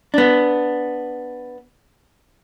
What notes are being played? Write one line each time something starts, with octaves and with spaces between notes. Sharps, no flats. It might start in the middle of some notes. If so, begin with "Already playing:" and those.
B3 D4